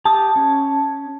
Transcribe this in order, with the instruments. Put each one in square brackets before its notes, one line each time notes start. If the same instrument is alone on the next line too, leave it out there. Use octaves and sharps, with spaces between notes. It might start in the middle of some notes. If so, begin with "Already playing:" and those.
[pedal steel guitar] G4 D#6 [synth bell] A5
[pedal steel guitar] C#4